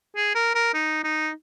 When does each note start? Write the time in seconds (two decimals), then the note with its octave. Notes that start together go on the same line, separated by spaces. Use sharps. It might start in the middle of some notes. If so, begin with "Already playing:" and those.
0.16 G#4
0.35 A#4
0.55 A#4
0.74 D#4
1.04 D#4